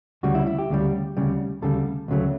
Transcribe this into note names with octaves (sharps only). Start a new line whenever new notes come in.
D2 C#3 G3 F#4
E4
E4
G4
D2 C#3 G3
D2 C#3 G3
D2 C#3 G3 A4
D2 C#3 F#3 A3